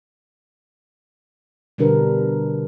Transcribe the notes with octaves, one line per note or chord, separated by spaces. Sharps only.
B2 D3 G3 D4 A#4 B4